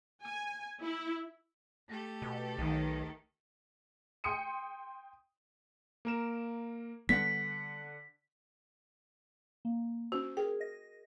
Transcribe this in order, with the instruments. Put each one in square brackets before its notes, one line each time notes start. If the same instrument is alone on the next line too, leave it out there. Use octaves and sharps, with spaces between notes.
[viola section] G#5
E4
[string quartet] A3 G4 A4
[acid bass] B2
[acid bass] B1 [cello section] D#3
[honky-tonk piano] G5 C6 D#6 C#7 D#7
[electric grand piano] A#3 A#4 E7
[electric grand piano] D3 F#5 [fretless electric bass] G3 B3 [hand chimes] B6
[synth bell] A#3
[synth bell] C#4 C5 [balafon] F#4
[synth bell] G#4 A#4 [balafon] G5
[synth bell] D#5 A#6